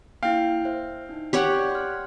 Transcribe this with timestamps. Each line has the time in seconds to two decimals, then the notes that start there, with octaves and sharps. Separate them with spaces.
0.23 A#3 D4 E4 F5 G5
0.65 C5 E5
1.09 D4 D#4
1.33 G4 C#5 F#5 C#6
1.59 D5 F#6 G#6
1.71 C6 F6